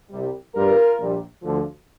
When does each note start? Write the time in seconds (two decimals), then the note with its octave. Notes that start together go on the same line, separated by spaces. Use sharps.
0.11 C2 C3 G3
0.55 G1 G2 G3 F4 A#4
0.99 A#1 A#2 G3
1.43 D2 D3 F3